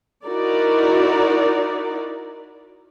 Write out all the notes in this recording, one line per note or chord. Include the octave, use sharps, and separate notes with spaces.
D#4 E4 F#4 A#4 D5